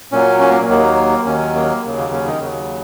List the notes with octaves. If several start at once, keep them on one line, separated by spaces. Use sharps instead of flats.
A#2 F#3 C#4
C#4
A#3
D#2 D#3 F#3 A#3
D#2 D#3 F#3 C#4
A#3
D#2 C#3 F#3
A#3
C#4
D#3 D#4
D#2 C#3 F#3